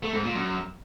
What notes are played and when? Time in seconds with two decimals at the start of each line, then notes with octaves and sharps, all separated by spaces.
0.03 A3
0.13 G#2
0.24 A#2
0.35 F#2